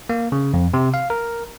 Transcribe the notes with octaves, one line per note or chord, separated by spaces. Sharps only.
A#3
C#3
F2
C3
F5
A#4